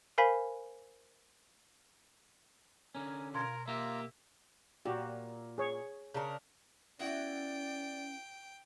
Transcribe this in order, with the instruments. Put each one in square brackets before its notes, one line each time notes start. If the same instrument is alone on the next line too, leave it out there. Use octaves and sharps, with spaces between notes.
[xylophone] A#4 C5 F5 G#5 B5 B6
[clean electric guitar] D3 C#4 [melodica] A#4 G#5
[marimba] B2 C6 G#6 [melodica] F4 [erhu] A#4
[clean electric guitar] A#3 G4 [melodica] F4 A#5 [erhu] E5
[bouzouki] A#2 [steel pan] F#4 G4
[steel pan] G#4 C#5
[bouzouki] C#3 D4 A#4
[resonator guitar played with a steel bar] B3 E4 F#4 [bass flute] C#4 [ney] D5 [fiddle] G5